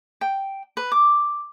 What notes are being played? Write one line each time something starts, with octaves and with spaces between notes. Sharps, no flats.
G5
B4
D6